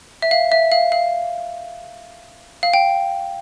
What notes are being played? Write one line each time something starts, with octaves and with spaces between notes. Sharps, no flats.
E5
F5
E5
F5
F5
F5
G5